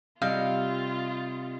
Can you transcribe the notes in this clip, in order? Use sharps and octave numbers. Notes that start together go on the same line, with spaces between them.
C3 G3 F4 D#5 F5 G6